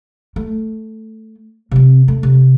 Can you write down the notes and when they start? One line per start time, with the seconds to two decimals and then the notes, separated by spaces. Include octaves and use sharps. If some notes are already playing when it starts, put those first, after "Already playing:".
0.36 A3
1.71 C3 C4
2.08 A3
2.23 C3